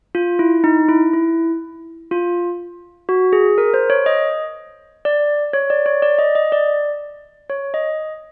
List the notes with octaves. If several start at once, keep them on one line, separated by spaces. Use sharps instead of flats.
F4
E4
D#4
E4
E4
F4
F#4
G#4
A#4
C5
C#5
D#5
D5
C#5
D5
C#5
D5
D#5
D#5
D5
C#5
D#5